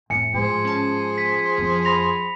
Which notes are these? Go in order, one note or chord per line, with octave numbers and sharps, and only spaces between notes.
F1 A2 G#5 C#7
G#2 F3 G#4 C5
C#4 A5
B6
F2
B5 A#6 F7